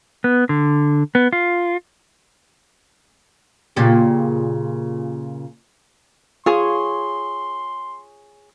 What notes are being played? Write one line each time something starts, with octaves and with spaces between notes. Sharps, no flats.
B3
D3
B3
F4
A#2 C#3 G4
F4 G#4 C#5 C6